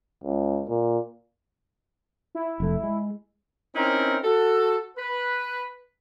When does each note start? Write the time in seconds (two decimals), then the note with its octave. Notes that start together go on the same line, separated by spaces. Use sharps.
0.24 C#2
0.69 A#2
2.35 E4
2.60 F1 A3
2.83 G#3
3.76 C4 C#4 D#4 E4 A#4
4.24 F#4 A4
4.98 B4